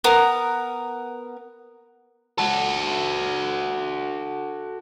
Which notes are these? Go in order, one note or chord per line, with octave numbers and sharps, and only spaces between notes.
B3 A#4
F#4 A4